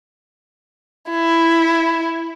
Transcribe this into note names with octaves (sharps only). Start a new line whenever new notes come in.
E4